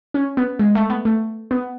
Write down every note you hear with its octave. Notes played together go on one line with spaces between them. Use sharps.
C#4
B3
G#3
A3
B3
A3
B3